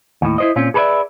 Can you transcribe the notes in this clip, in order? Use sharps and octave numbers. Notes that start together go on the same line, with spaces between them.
D#2 A2
E4 C5 D#5
A#2 C4 C#4 F4
G#4 A4 B4 C5 D5 E5